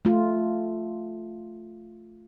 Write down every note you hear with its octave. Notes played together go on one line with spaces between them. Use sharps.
A3 F4